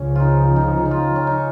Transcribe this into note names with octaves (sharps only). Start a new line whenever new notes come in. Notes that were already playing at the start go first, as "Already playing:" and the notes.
Already playing: C#2 C#3 F3 C#4
D#4 F4
D#4
D#4
F4
C#4
D#4